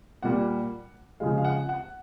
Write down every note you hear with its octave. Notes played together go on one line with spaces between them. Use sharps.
A#2 G3 A#3 F#5
C#3 F3 G#3 F5
F5
F#5
F#5